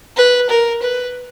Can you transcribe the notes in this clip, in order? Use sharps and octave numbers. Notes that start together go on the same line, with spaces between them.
B4
A#4
B4